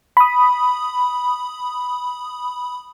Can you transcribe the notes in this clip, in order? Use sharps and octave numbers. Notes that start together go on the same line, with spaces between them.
B5 D#6